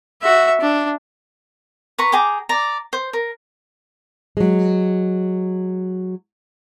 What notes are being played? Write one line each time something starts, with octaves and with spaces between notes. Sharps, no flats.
F#4 E5
D4
B4 A#5 C#6
G#4 G5 A#5 D6
D5 A#5
C5
A#4
F#3 G#3